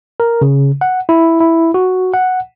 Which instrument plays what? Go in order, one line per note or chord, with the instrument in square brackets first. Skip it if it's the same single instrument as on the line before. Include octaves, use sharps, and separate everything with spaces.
[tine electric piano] A#4
C#3
F#5
E4
E4
F#4
F#5